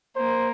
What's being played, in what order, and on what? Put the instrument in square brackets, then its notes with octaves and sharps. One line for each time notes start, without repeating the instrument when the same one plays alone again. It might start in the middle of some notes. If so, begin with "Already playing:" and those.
[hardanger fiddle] A#3 [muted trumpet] C5